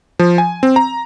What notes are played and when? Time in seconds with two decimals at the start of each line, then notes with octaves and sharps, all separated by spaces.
0.19 F3
0.38 G#5
0.63 C4
0.76 A#5